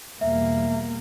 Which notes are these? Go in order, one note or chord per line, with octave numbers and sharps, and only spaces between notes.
E2 B2 G3 A#3 E5